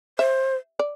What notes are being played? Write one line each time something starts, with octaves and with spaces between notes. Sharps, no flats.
C5 E5
D5